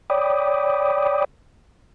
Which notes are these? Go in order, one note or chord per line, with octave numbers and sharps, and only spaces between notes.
C#5 D5 G5 B5 D6 D#6